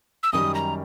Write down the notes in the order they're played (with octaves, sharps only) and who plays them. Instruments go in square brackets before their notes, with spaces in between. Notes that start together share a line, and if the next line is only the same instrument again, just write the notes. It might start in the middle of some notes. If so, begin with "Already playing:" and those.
[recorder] E6
[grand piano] F#2 D#3 G3 [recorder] D#6
[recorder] A#5